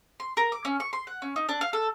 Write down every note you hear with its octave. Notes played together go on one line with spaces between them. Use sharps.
C6
A#4
D6
C#4
C#6
C6
F#5
C#4
D#4
D4
F5
A4